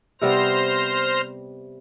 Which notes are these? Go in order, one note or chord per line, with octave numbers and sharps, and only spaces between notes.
C3 G3 B3 C5 F6 A#6